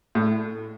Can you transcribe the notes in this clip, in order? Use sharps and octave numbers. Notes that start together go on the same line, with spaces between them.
A2